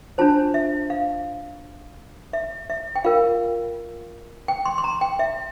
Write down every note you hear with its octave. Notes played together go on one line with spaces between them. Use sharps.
D4 F4 C5 A5
E5
F5
E5
E5
G5
F4 A#4 F5
G5
C6
C6
A#5
G5
E5